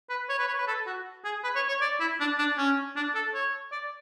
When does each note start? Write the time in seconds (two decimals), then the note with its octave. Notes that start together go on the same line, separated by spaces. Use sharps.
0.10 B4
0.29 C#5
0.39 B4
0.48 C#5
0.58 B4
0.67 A4
0.86 F#4
1.24 G#4
1.44 B4
1.56 C#5
1.68 C#5
1.81 D5
2.00 E4
2.20 D4
2.38 D4
2.58 C#4
2.96 D4
3.15 A4
3.34 C#5
3.72 D5